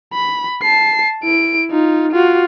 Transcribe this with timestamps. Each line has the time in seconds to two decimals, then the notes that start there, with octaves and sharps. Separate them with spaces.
0.13 B5
0.63 A5 C7
1.23 E4 D7
1.71 D#4 F4
2.12 F4 F#4